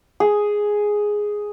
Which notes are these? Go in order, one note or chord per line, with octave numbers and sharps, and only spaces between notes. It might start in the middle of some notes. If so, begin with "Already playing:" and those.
G#4